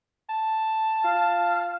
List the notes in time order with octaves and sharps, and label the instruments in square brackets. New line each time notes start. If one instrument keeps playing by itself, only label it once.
[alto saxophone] A5
[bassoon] F4 [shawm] F5